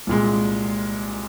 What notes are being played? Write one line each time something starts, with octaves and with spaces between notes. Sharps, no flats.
C2 A#2 G#3